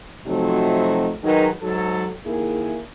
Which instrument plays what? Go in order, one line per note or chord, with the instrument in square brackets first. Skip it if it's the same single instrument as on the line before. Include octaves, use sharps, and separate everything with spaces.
[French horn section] C3 F3 F#3 A3 D#4 F#4
D#3 F#3 G#3 D#4 G#4 B4
G#2 F#3 A4
D#2 A#3 E4 G#4